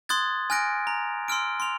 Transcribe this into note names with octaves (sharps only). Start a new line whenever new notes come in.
C6 D#6 F#6 G#6 A6
G#5 F6 F#6 A#6 D7
A#5
C6 E6 F6 D7
C6 F7